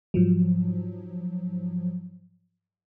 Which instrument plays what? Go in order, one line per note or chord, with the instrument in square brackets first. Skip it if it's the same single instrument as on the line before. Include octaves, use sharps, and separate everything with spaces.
[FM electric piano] G#2 F3 F#3